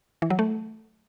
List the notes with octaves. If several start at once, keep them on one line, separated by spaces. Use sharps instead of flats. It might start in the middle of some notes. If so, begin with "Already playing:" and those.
E3
F#3
A3